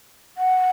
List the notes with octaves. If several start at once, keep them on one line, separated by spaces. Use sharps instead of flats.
F#5